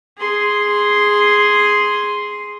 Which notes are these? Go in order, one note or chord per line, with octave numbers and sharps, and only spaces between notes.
G#4 C6